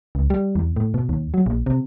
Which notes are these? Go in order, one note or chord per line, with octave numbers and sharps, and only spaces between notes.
C#2
G3
E2
A2
B2
D#2
F#3
A#1
C3